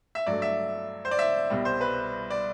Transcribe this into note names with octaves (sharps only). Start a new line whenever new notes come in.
E5
G2 F#3 A3 D5
E5
C5
D5
E5
C2 B2 G3
C5
B4
D5